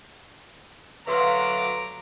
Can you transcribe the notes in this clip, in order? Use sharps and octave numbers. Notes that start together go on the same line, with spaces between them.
D3 F#3 B4 E5 F5 A#5 C6 D6